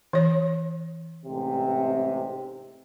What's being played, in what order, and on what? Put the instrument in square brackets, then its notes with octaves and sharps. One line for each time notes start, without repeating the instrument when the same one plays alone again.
[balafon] E3 C#5
[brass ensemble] A1 G#2 C3